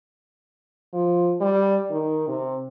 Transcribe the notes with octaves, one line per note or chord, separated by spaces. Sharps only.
F3
G3
D#3
C3